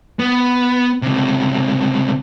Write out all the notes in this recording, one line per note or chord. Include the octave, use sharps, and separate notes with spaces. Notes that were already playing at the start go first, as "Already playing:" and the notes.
B3
C#2 C3